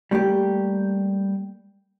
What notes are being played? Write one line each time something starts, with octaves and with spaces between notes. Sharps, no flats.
G3 A3 A#3 G4